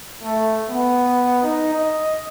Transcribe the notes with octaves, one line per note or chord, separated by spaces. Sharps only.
A3
B3
D#4
D#5